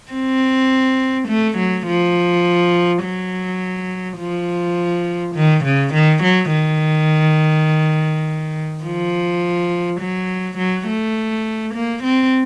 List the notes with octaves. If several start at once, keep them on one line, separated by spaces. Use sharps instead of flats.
C4
A3
F#3
F3
F#3
F3
D#3
C#3
D#3
F#3
D#3
F3
F#3
F#3
A3
A#3
C4